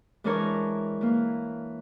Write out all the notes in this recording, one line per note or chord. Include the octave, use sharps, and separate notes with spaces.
E3 G#3 D4 E4 A#4 C#5
E3 A#3